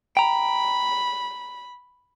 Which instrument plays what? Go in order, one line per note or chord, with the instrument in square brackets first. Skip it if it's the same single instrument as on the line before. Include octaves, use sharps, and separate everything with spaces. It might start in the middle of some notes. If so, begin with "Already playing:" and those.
[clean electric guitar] G5 A#5 [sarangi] B5